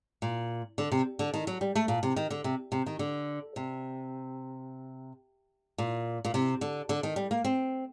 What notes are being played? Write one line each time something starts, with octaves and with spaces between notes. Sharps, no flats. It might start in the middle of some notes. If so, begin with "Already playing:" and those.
A#2
D3
C3
D3
D#3
F#3
G3
A3
A#2
C3
D#3
D3
C3
C3
D#3
D3
C3
A#2
A#2
C3
D3
D3
D#3
G3
A#3
C4